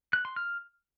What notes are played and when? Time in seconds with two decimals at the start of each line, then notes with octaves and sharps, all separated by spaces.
0.13 F#6
0.25 C6
0.36 F6